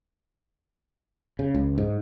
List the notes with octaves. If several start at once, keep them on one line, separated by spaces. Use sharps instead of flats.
C#3
C#2
G#2